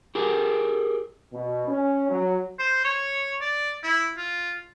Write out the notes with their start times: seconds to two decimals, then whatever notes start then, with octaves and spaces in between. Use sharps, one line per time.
0.15 G4 G#4 A#4
1.33 B2
1.67 C#4
2.09 F#3
2.59 C5
2.84 C#5
3.41 D5
3.83 E4
4.17 F4